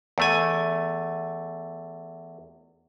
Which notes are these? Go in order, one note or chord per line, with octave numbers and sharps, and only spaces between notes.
E2 A3 G#5